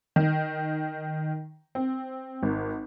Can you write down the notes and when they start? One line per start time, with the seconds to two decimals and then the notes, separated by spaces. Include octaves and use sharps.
0.16 D#3
1.75 C4
2.42 G#1